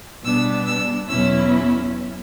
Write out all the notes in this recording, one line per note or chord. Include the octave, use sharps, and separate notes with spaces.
B2 G3 B3 D4 E6
E6
E2 B2 F#3 C#4 E4 E6